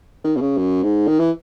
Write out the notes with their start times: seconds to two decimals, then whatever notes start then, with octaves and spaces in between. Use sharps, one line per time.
0.24 D#3
0.36 B2
0.41 C#3
0.58 F#2
0.83 G#2
1.08 D#3
1.20 E3